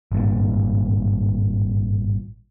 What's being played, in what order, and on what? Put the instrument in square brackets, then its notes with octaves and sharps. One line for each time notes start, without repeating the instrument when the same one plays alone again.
[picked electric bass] G#1 G2 A#2